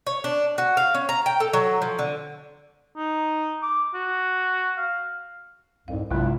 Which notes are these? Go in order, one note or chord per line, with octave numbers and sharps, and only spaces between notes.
C#5
D4
F#4
F5
C#4
A#5
G5
A4
F#3
F3
D3
D#4
D6
F#4
F5
C2 F2 G#2 F5
B1 G2 C3 F#3 G#3 E4 F4